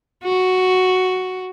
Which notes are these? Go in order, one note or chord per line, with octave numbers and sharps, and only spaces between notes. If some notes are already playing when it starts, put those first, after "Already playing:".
F#4